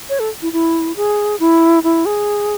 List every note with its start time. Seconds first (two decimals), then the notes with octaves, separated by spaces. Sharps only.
0.10 C#5
0.20 A4
0.42 E4
0.53 E4
0.96 G#4
1.40 E4
1.84 E4
2.06 G#4